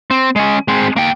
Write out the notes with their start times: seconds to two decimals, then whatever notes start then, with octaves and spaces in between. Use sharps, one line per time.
0.11 C4
0.36 G#3 C#4
0.68 G#3 C4
0.96 A#3 G5